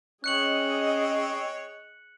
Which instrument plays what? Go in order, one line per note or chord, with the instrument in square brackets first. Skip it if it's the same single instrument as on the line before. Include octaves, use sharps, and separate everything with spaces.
[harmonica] C4 C#5 [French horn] C#4 [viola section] G#4 D#5 [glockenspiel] F#6 C#7 F#7